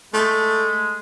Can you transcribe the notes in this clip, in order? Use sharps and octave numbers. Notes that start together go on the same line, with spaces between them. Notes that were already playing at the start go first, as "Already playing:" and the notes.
G#3 A3